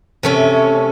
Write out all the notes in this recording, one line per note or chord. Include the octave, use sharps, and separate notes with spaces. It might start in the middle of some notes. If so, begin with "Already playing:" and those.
C3 A3 C#4